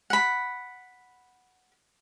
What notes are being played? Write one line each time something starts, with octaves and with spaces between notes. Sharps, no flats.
F#5 B5